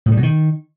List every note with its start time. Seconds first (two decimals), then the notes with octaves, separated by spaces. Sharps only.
0.06 A2
0.12 G3
0.17 B2
0.23 D#3